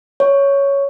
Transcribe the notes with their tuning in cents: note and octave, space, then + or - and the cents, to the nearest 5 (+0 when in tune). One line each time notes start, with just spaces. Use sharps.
C#5 +5